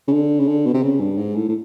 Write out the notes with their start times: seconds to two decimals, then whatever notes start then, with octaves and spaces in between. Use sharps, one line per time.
0.08 C#3
0.13 D3
0.40 C#3
0.48 D3
0.66 B2
0.74 C3
0.83 C#3
1.00 G2
1.18 G#2
1.36 A2
1.49 A2